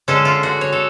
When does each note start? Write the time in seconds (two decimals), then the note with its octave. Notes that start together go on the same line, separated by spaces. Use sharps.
0.08 D3 G#3 C#4 A4
0.25 F4
0.43 F#4
0.61 C#5
0.73 A4